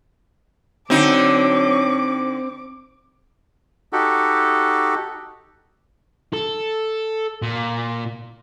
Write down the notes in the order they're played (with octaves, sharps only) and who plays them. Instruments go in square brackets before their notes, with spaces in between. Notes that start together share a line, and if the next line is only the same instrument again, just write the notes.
[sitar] D3 D#4 [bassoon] F#3 [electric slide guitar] C4 [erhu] D6
[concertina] D#4 F#4 G4 A4
[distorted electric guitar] A4
A#2